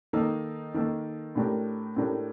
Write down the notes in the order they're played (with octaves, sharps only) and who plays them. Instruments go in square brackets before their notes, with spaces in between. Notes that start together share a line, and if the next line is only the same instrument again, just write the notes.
[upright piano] D#3 A#3 D#4 A4
D#3 A#3 D#4 A4
A2 A3 D4 G4 A#4
A2 A3 D4 G4 A#4